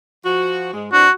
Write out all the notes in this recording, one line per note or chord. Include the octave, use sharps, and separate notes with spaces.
F3 F#4
G#2 G#3
E3 C4 D4 F#4